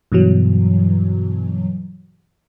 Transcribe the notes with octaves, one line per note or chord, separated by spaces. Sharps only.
G2 B2 E3 F#3